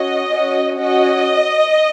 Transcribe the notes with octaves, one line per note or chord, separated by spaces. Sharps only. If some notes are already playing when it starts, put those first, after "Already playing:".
Already playing: C#4 F#4 D#5
C#4 F#4
C#4 F#4 D#5